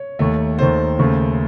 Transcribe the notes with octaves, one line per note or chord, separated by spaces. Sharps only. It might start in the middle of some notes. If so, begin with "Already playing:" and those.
Already playing: C#5
D#2 D#3 A3
D#2 D#3 A3 C5
D#2 C#3 A3